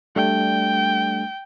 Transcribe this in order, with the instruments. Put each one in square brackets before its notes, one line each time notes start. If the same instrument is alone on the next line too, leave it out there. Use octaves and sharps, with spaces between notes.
[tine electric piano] G3 A3 D4 [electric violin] G5